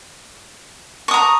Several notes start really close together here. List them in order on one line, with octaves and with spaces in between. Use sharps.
C#6 D#6 A#5